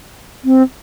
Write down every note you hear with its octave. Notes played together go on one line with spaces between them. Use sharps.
C4